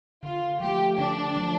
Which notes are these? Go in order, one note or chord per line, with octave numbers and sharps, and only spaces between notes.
D3 F4
F3 A3 G4
D3 D4
F3 A3